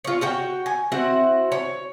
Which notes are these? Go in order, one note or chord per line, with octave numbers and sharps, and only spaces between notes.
F4 C#5
F#4 C#5 G5
G#5
C4 E4 F#4
C#5